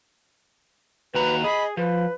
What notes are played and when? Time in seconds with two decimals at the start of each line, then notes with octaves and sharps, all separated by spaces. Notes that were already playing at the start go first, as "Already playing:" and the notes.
1.14 D#2 F#4 B4 A#5
1.44 G#4 D#5 B5
1.77 F3 B4